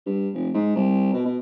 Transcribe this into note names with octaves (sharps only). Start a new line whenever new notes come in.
G2
F1
G#2
C2
B2
B2